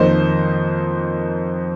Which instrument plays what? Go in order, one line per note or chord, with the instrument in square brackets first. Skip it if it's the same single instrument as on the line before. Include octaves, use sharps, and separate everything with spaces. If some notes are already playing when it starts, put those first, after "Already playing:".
Already playing: [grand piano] F2 D#3 A#3 C5 D#5